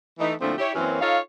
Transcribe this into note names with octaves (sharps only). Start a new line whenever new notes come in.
E3 A3 D#4
A#2 D3 F3 A3 C4 E4
E4 G4 C#5
F#2 E3 F#3 A#3 C4 C#4
D#4 F4 A4 C#5 F5